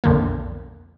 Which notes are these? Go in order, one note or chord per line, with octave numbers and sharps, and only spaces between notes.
B1 F2 D3 A#3